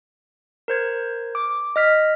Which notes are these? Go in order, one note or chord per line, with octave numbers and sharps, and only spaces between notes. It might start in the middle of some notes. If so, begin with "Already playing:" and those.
A#4 C5 G#6
D6
D#5 F6 B6